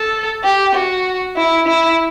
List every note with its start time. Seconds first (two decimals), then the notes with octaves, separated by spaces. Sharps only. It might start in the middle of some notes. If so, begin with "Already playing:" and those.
Already playing: A4
0.44 G4
0.75 F#4
1.37 E4
1.68 E4